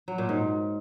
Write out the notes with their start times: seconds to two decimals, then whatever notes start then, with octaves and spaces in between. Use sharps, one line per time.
0.08 F#3
0.18 A#2
0.29 G#2